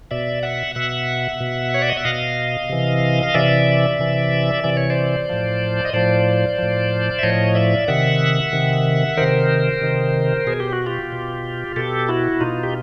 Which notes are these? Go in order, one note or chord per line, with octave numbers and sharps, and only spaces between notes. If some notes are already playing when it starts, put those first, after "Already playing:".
B2 D5 E5
E5 F#5
B2 E5 F#5
B2
C#5
D5
D#5
E5
B2 D#5 F5
C3 E3
F5
C3 E3 D5 E5
C3 E3
C3 E3 D5
C#5
C5 D5
A2 F3
D#5
A2 F3 C5 D5
A2 F3
E5
A2 F3 C#5 D#5
D5 E5
C3 D#3 E5 F#5
C3 D#3
C3 D#3 A#4 C5
C3 D#3
B2 G#4
G4
F#4
F4 G4
B2
B2 G4 A4
E4 F#4
B2 D#4 F4
G4